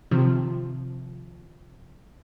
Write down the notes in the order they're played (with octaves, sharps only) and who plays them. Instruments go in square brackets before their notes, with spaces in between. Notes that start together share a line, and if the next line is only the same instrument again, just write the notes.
[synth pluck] C3 D#3 F3